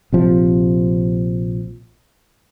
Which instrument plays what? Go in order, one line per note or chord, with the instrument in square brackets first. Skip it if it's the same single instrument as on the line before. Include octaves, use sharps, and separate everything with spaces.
[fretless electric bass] A#1 C3 F3